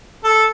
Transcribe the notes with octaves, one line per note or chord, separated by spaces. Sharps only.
A4